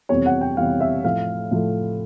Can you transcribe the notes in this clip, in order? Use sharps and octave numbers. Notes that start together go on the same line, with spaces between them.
F2 C3 E3 G3 B3 C#5
F#5
G5
F2 C3 E3 G3 B3 F5
E5
A2 F3 A3 F5
A2 F3 A3